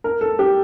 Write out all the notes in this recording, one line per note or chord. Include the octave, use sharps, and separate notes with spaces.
A#4
A4
G4